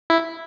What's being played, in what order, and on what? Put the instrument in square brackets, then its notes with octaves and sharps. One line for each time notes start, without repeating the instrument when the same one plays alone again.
[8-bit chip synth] E4